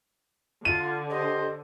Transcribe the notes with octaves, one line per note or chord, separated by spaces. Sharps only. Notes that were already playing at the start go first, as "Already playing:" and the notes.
D3 F4 D#7
G4 A4 C5 D#5